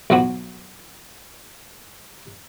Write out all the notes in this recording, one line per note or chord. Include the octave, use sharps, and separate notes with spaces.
B1 F3 F#3 F#4